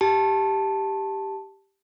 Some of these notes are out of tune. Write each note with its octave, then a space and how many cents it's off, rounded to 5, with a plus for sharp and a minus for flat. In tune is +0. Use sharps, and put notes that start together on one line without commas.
G4 +0 A5 +0